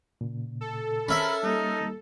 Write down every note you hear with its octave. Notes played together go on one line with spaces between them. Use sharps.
A#2 C#3
A4
C#4 A#4 E5 B5
G3 A#3 D#4